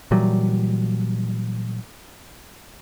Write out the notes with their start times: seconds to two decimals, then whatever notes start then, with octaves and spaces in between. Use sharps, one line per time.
0.11 A#2 E3 F#3 G3